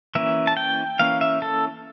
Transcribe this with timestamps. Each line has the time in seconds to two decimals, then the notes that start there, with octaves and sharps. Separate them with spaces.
0.15 E3 A#3 C#4 E5
0.47 A5
0.57 G5
0.99 E3 A#3 C#4 F5
1.21 E5
1.42 A4